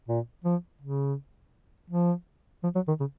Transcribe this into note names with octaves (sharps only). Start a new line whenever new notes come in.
A#2
F3
C#3
F3
F3
F#3
D#3
C#3